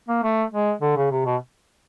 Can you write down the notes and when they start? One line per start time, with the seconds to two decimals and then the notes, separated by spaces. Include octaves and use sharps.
0.08 A#3
0.23 A3
0.52 G#3
0.81 D3
0.96 C#3
1.11 C3
1.25 B2